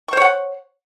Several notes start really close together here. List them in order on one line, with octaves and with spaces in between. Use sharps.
C#6 C5 C#5 F#5